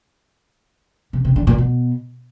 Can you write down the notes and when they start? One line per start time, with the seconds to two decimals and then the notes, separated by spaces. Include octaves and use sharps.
1.13 C3
1.24 C3
1.36 D3
1.47 A#2
1.58 B2